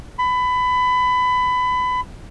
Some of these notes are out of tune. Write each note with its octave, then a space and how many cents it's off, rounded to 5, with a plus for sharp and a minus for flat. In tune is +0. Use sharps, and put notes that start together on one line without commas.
B5 +20